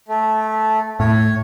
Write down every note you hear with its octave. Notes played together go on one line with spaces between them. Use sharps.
A3
A2 C#5